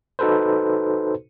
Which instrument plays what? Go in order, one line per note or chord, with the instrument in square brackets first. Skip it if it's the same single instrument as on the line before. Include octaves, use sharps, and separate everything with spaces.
[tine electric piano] D#4 F#4 A4 B4 C5